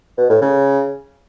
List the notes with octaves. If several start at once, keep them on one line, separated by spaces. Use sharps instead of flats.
B2
A2
C#3